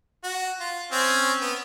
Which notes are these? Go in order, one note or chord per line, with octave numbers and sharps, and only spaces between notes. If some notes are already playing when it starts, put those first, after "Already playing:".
F#4
F4
C4 C#4
B3